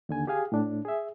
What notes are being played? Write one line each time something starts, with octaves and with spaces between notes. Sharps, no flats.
D#2 D3 G#5
G4 G#4 F5 G#5
A2 D4
G#4 E5